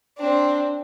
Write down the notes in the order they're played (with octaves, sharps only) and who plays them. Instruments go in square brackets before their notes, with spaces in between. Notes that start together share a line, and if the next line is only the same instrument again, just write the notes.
[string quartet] C4 D4